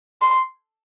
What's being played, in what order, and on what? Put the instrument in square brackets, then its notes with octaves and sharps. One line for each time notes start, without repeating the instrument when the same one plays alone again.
[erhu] C6